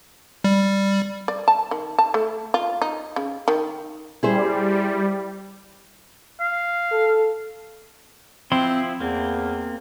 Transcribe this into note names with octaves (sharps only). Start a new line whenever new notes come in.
G3
D5
A5
D#3
A5
A3
F4
D#4
C#3
D#3
G3 E4 G#4 C5
F5
A4
F3 C4 E4 C6
E2 A#3 C4